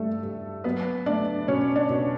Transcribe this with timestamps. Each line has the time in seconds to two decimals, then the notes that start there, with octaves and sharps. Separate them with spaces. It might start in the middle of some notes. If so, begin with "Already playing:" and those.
Already playing: G2 G3 A3 A4
0.23 G2
0.64 F#3 B3 B4
1.06 A3 D4 D5
1.48 B2 C#4 C#5
1.76 D4 D5
1.89 B2